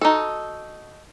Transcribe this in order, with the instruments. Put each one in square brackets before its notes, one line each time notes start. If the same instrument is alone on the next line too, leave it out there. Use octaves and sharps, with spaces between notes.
[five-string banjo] D#4 F#4 A4